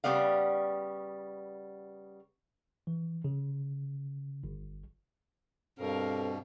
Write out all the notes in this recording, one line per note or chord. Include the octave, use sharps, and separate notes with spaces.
C#3 G3 B3 D5 F5
E3
C#3
G1
G2 B2 C4 A4 A#4 F5